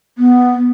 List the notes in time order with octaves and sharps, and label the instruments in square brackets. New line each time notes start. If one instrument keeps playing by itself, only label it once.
[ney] B3